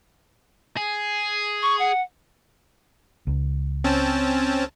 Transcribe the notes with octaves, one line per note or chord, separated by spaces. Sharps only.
G#4
C#6
F#5
C#2
C4 C#4 A5